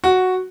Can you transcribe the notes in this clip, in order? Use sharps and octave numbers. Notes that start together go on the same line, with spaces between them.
F#4